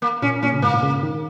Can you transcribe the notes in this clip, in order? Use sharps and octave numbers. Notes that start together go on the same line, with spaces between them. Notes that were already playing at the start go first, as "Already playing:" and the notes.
A#3
A#2 C#4
A#2 C#4
C#3
G#2 A#3
A#2
C#3
D#3